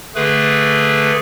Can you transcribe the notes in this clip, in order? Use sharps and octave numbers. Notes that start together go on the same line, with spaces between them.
D3 A3 G#4 B4